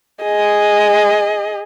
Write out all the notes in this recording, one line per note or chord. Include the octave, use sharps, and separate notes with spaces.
G#4 D#5